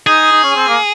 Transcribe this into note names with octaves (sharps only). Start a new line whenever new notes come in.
D#4 G#4
D#4
C#4
C4
A#3